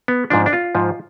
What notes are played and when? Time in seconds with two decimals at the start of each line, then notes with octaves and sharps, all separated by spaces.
0.08 B3
0.30 G#2 F3 D4
0.46 D4
0.53 F4
0.75 G#2 F3